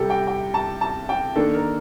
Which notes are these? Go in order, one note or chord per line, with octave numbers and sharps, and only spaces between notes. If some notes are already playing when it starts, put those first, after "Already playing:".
Already playing: C3 G3 G4 A4
G5
G5
A5
A5
G5
D#3 A#3 D4 A4
A#4